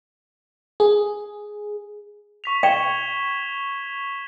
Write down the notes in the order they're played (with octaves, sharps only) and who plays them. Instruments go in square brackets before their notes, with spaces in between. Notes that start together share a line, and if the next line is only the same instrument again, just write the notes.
[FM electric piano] G#4
[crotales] C#6 B6 F7
[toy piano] G5 [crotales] G#6 E7 G7